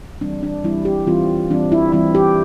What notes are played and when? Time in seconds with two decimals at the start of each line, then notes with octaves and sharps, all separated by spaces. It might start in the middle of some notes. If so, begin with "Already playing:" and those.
0.21 E3 G3 C4 D4
0.43 D4
0.64 E3 G3 C4 E4
0.85 G4
1.07 E3 G3 C4 F4
1.50 E3 G3 C4 D4
1.72 E4
1.92 E3 G3 C4 E4
2.15 G4